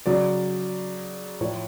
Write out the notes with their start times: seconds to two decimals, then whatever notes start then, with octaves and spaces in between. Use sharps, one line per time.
0.06 C#3 F#3 D5
1.41 A2 F3 C#5